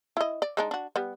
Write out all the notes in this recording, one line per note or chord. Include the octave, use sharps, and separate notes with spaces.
E4 D#5
D5
G#3 D4 D#4
D4 F#4
G3 B3